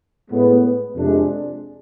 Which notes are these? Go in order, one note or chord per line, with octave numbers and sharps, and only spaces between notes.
A2 G#3 B3
F2 C3 G#3 D4